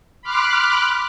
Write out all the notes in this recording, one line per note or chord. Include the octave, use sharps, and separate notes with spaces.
B5 C6 D6 F6 F#6